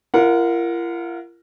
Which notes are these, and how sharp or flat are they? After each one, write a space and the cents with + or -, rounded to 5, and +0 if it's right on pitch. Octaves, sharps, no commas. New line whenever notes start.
F4 -45 A#4 +0 F#5 -20